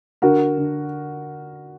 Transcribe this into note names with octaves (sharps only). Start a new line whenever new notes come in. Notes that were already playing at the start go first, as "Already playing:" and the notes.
D3 F#4 A#4
D3